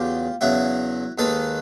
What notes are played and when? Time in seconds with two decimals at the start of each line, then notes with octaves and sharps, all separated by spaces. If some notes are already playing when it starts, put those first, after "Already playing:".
Already playing: E2 C#3 F#3 F4 G4
0.41 E2 C#3 F#3 E4 F#4
1.18 D#2 D#3 G#3 A4 B4